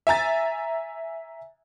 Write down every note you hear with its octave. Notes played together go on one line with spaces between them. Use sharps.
E5 G#5 A#5 A6